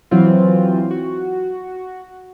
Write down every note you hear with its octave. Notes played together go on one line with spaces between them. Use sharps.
E3 F#3 C4 F4
F#4